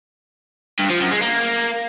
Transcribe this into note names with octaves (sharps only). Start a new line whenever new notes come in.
G2
F3
F#2
G#3
A#3